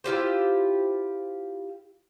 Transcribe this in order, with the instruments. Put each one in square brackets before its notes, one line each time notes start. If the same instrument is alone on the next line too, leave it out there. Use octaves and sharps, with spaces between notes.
[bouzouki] E4 F4 G4 C5